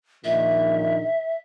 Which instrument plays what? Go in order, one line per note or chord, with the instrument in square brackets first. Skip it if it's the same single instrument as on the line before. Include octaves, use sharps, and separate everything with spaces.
[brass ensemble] A#1 D#3 [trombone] A#2 [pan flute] E5